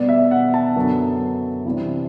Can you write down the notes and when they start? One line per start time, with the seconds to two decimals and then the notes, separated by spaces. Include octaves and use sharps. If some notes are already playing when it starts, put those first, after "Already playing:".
Already playing: B2 G3 B3 D5
0.09 E5
0.31 F#5
0.54 A5
0.76 F#2 D3 F#3 B3
1.65 C3 E3 G3 C4